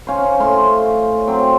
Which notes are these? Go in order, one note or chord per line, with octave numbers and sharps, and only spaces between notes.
C#4 F4 C5
A2 C6
F#3 C4